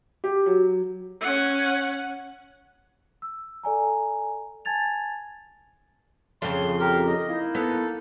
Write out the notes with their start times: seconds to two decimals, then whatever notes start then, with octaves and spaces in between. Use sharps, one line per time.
0.24 G4
0.46 F#3
1.21 C#4 F#5
3.22 E6
3.63 A4 D5 G#5 A#5
4.65 G#5 A5 G#6 A6 F7
6.42 F2 C#3 C6
6.80 G4 A#4
7.07 D#5
7.27 A#3 D#4 E4
7.55 B3 A4